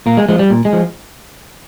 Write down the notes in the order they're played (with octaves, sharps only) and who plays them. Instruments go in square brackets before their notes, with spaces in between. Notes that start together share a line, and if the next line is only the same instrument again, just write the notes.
[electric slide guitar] A#2 A#3
G#3
F3 G#3
G3
A#2
G#3
F3